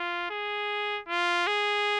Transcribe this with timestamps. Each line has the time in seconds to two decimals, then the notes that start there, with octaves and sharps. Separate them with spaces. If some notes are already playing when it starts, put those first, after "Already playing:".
Already playing: F4
0.30 G#4
1.09 F4
1.47 G#4